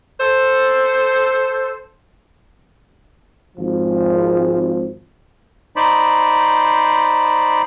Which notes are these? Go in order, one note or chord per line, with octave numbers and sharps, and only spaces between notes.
A4 C5
G#1 F3
D#4 C5 D5 B5